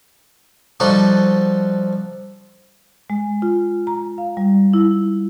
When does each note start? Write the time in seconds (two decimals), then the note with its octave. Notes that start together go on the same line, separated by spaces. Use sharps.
0.80 F3 G3 D#4 F#4 A4
3.10 G#3
3.42 F4
3.87 A#5
4.18 F5
4.37 G3
4.73 E4